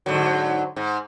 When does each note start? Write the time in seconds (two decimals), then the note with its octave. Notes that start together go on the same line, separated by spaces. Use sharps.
0.06 G#2 D3 F#3
0.76 G#2